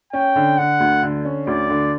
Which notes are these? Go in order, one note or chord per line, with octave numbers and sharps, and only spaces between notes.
C#4 G5
D3
D3 F#5
D2
D3
C#4
D2 D5
D3